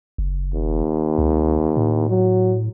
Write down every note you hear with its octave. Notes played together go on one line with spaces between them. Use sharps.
F#1
D#2
C#2
A2
F#3